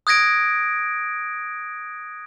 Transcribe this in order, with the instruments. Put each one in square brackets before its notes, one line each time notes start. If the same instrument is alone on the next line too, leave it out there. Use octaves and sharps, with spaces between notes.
[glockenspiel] D#6 F#6 G#6 A#6 D7